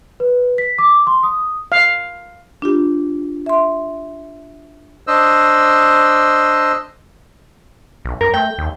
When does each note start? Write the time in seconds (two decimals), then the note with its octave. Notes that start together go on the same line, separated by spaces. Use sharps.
0.20 B4
0.58 B6
0.78 D6
1.07 C6
1.23 D#6
1.72 F5
2.62 D4 F4 G4
3.46 E5 C6
5.07 D4 C5 D#5 E6
8.05 B1
8.21 F#2 A#4
8.34 A3 G5
8.58 D#2